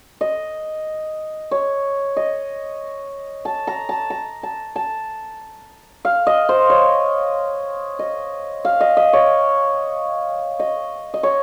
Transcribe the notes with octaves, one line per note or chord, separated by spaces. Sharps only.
D#5
C#5
D#5
A5
A#5
A5
A#5
A5
A5
F5
D#5
C5
C#5
D#5
F5
D#5
D#5
C#5
D#5
D#5
C#5